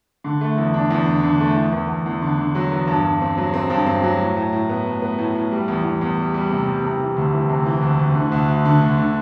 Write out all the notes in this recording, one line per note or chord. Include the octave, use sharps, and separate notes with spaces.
D3
A3
E2
D4
E2
D3
D3
A3
E2
E2
E2
E2
D3
D3
F#3
E2
G2
G2
C4
F#3
C4
G2
C4
F#3
A2
A2
A2
B3
A2
B3
A2
A2
G3
E2
E2
E2
G3
G3
C3
G3
C3
E3
D2
E3
C3
E3
D2
D2
D3
D2
D2
D3
D2
D3